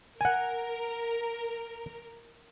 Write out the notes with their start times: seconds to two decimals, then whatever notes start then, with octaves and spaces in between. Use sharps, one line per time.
0.21 A#4 F#5 G#5